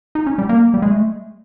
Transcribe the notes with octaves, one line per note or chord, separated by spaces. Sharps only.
D#4
C#4
G3
A#3
G3
G#3
A3